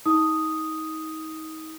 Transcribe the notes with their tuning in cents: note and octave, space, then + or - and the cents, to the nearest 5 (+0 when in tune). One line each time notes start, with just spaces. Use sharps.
D#4 +30 D#6 +0